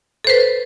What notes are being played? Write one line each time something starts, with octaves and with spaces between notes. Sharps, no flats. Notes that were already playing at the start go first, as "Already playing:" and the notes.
A4 B4 C5